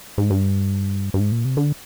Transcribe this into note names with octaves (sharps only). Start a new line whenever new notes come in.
G#2
G2
G2
G#2
A#2
C3
D3